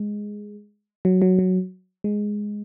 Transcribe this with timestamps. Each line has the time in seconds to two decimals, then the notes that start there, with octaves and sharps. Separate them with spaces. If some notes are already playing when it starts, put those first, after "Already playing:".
Already playing: G#3
1.05 F#3
1.22 F#3
1.39 F#3
2.04 G#3